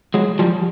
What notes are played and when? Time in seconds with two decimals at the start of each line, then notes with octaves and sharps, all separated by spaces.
0.14 F#3 G#3
0.39 F3 G3